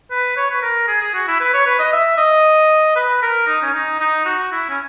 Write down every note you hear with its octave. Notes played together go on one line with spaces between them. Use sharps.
B4
C#5
B4
A#4
G#4
G#4
F#4
E4
B4
C#5
B4
D#5
E5
D#5
B4
A#4
D#4
C#4
D#4
D#4
F#4
E4
C#4